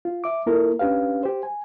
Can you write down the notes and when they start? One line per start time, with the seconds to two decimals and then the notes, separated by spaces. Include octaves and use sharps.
0.05 F4
0.24 E5 D6
0.46 A#3 E4 F4 A4 A#4
0.79 C#4 D4 G4 B4 F5
1.23 G4 C5
1.43 G#5